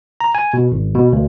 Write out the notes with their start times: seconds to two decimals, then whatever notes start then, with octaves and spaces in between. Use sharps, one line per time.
0.20 A#5
0.35 G#5
0.54 B2
0.72 G#1
0.95 B2
1.13 D2